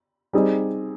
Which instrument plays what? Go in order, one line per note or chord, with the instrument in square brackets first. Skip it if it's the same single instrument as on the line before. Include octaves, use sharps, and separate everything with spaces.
[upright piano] G3 C4 D#4 G#4